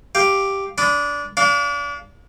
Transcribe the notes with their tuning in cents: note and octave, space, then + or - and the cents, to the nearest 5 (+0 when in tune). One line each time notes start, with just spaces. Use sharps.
G4 +0 F5 +0
D4 -20 B5 +25 D#6 +0
D4 -35 F5 +0